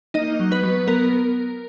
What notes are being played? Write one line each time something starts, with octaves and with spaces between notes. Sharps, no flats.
A#3 D#4 D#5
F#3
B3 B4
F#3
B3 A#4